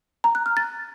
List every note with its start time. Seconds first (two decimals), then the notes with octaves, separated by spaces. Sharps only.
0.24 A#5
0.35 F#6
0.46 F6
0.57 A6